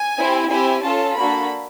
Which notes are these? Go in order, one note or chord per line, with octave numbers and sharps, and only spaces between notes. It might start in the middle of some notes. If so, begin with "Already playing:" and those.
Already playing: G#5
C4 E4 G4
C4 E4 G4 G#5
C#4 F4 A4 A5
A#3 D4 F#4 A4 B5